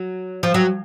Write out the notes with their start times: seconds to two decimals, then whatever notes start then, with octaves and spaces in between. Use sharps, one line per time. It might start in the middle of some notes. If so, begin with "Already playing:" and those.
Already playing: F#3
0.43 F3
0.54 F#3